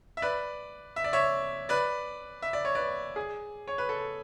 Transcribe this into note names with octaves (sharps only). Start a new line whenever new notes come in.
E5
B4 D5
E5
D5
C#5 E5
B4 D5
E5
D5
C#5
B4 D5
G#4
C#5
B4
A4